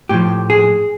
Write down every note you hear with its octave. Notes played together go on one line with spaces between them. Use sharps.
A2 F3 G4
G#4